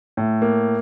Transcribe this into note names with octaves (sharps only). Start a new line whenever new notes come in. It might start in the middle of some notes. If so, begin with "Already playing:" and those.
A2
A#3